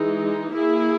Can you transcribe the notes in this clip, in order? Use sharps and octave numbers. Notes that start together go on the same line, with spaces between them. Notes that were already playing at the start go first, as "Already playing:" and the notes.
Already playing: E3 G#3 D#4
A#3 E4 G#4